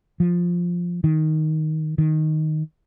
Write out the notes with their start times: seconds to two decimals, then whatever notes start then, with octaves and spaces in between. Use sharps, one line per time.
0.20 F3
1.04 D#3
1.98 D#3